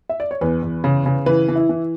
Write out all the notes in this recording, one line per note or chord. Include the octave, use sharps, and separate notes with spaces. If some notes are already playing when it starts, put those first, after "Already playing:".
E5
D5
C#5
E2 B4
E2
C#3
C#3
E3 B4
E3
E4
E3